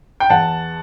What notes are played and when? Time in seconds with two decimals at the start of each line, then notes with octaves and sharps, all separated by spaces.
0.20 G5
0.30 E2 F#5 A5